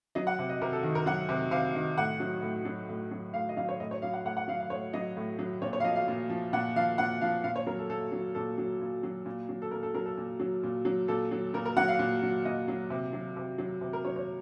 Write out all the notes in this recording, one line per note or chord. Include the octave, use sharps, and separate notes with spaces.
F#3 D#5
F#5
C3
D#5
C3 A#4
A4
D#3
A#4
F#3 F#5
C3
C3 F5
D#3
A2 F#5
F#3
A2
F#3
A2
F#3
A2 F5
D#5
F#3 F5
C#5
A2 D#5
C#5
F#3 F5
F#5
A2 F#5
F#5
F#3 F5
F5
A2 C#5
F#3 D#5
A2
F#3
A#2 C#5
C#5
F5
F3 D#5
F5
A#2
F3
A#2 F#5
F3 F5
A#2 F#5
F3 F5
A#2 F5
C#5
F#3 A#4
A4
A#2 A4
F#3
A#2 A4
F#3
A#2
F#3
A#2
F#3
A4
A#2 A#4
A4
F#3 A#4
A4
A#2
F#3
A#2
F#3
A#2 A4
F#3
A#2 A#4
A#4
F#3 F#5
F5
A#2
F#3
A#2 D#5
F#3
C3
F#3
C3
F#3
C3
A#4
F#3 C#5
C#5